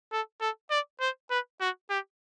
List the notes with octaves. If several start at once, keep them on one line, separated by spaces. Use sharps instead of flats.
A4
A4
D5
C5
B4
F#4
G4